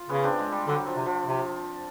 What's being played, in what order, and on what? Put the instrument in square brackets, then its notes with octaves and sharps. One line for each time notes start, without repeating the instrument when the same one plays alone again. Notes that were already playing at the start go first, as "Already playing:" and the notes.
Already playing: [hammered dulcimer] F4
[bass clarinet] C#3 [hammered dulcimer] B3 C#4
[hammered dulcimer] C4 D4
G#3
G3
[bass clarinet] D3 [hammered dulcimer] F#3
[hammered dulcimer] F3
[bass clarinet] C3
[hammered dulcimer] F3
[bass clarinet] C3